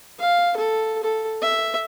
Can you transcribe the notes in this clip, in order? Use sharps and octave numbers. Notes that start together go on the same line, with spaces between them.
F5
A4
A4
E5